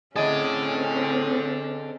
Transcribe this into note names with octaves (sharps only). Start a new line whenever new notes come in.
A2 C4 C#4 G#4 A4 D5 D#5